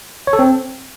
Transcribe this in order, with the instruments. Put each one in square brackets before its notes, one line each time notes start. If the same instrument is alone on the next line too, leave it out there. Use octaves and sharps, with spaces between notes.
[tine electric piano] C#5
A4
C4